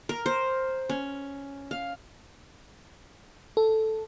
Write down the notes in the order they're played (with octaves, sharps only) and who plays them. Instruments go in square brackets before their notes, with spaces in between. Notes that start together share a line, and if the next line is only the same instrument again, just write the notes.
[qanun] A#4
C5
C#4
F5
[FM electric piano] A4